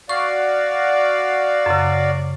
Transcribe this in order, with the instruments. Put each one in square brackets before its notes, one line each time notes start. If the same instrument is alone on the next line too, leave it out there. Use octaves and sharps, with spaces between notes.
[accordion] F#4 D5 F5 [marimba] C#6
[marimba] F#2 C#3